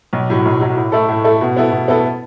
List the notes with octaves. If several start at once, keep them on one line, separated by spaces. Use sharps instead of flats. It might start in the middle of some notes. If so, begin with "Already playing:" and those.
B1
A2 F#3
B1
A2 F#3
A2
A3 E4 A4
A2
A3 E4 A4
B2
B3 E4 A4
B2
B3 E4 A4